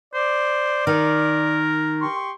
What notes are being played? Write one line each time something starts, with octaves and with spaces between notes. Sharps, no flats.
C5 D5
D#3 A#4
G4 C6 C#6